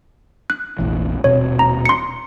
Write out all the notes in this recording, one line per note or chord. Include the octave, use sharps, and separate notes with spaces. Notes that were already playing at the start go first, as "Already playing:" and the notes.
F#6
F1 A#1 E3
D#1 B2 C4 C#5
A#5
C6 C#7